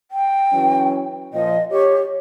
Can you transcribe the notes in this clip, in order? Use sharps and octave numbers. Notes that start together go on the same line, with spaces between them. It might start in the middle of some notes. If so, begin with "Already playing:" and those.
G5
E3 F#3 C#4
A#2 F3 D#5
G4 C#5